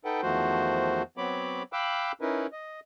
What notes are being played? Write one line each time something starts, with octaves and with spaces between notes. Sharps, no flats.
D#4 A4 B4 F#5 G5
E2 D#3 F3 A3 F#4 C5
F#3 B3 C4 C#5 B5 D6
F5 G5 B5 D6 E6 F#6
C#4 D#4 E4 A#4 B4
D#5